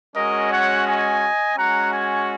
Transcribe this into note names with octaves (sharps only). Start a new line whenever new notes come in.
G#3 C#4 F#4 A#4 D#5
C#5 F#5
D#5 G#5
G#3 C#4 F#4 F#5 A#5
G#5 C#6